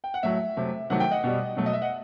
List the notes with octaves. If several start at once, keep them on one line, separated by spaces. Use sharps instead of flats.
G5
F#5
A2 F#3 A3 E5
C3 F#3 A3
C3 D#3 F#3 A3 F#5
G5
D#5 F#5
B2 G3
B2 F#3 A3
D#5
E5
D#5 F#5